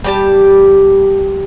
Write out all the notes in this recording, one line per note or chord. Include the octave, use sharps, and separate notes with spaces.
G3 G4 A5